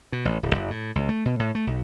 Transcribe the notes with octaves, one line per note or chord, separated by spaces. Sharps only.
B2
A1
D1
F#1
A2
C#2
A3
B2
A2
A3
B1